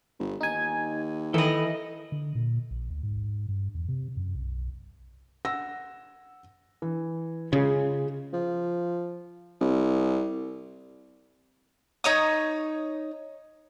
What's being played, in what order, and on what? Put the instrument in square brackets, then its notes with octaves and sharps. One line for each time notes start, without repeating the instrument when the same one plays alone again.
[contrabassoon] G1
[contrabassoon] D#2 [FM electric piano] D#4 G#5
[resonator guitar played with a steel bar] D#3 D#5 [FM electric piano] E3 [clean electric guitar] A4 B5
[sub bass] D3
A#2
A#1
D2
G#2
G2
E2
C3
F#2
B1
[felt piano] F#5 E6 A#6
E3
[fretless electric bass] C#3 [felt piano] G#3 F4 G#4
[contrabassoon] F3
C2
[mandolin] D#4 C#5 D#6